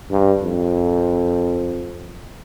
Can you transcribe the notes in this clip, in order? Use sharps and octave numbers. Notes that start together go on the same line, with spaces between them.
G2
F2